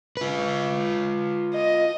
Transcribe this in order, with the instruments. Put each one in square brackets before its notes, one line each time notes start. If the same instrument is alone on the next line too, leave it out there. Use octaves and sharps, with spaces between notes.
[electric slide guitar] F4 B4
[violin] D#5